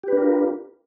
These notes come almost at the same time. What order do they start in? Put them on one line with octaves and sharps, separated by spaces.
G4 B4 D4 A#4 F4